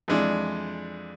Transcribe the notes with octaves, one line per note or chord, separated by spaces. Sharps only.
F2 E3 G#3 D4